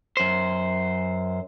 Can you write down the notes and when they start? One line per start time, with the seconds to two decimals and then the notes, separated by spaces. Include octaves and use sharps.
0.17 F#2 C5